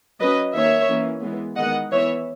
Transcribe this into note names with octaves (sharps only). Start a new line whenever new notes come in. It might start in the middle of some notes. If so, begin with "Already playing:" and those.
F#3 C#4 B4 D#5
D#3 A#3 C#4 C#5 E5
E3 A#3 C#4
E3 G#3 B3
D#3 G#3 B3 D#5 F#5
E3 B3 C#5 E5